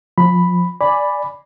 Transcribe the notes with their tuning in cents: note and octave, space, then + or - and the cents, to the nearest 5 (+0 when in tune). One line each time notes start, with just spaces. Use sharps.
F3 +25 B5 +0
D5 +0 G#5 +0 B5 +0